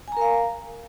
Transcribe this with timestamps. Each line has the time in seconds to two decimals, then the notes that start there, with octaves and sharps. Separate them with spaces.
0.08 G#5
0.12 A#5
0.17 A#4
0.21 F5